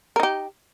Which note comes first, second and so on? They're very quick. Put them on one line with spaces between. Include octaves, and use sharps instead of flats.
A#4 D#4 G4